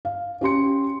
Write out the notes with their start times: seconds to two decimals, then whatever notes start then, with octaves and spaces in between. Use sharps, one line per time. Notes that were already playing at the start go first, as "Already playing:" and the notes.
0.05 F5
0.41 C#4 G4 C6 C#7